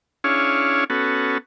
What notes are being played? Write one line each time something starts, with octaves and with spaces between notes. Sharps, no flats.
C#4 D4 E4 G#4 C#5 F5
B3 C#4 F#4 A4